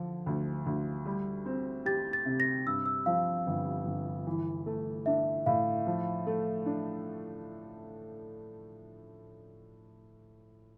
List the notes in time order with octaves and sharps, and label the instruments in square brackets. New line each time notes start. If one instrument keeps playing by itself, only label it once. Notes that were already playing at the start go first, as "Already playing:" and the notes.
Already playing: [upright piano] D3 F3
D2
D2
G3
C4
[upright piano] G4 [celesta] A6
[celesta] A6
[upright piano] C3
[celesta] A#6
[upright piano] G2 [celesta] E6
[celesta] E6
[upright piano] F3 [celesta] F5
[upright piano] G1
G1
E3
A3
[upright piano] D4 [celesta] E5
[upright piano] A2 [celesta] F5
[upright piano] F3
A3
D4